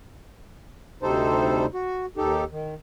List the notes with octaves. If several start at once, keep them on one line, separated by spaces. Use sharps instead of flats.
D2 C3 G3 D#4 A4 C5
F#4
D#2 D#4 G4 A4
D#3